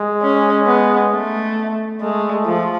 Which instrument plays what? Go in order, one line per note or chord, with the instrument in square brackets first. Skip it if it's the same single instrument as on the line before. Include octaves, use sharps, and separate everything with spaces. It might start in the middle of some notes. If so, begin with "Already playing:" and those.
Already playing: [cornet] G#3
[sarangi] C#4
B3
A3
[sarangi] G#3 [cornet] A3
[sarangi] F3